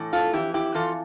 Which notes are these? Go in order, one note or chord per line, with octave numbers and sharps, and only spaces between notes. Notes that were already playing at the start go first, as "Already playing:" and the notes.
Already playing: A2 E3
F4 A4
F2 E3 E4 G4
E4 G4
F2 E3 F4 A4